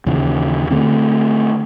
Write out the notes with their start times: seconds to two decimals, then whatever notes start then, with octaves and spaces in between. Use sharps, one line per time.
0.06 D#2 C#3 E3
0.71 D3 A3 C4